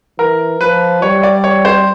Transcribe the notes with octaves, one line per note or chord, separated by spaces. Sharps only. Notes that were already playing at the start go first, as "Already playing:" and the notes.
E3 A#4
F3 B4
G3 C#5
D5
C#5
C5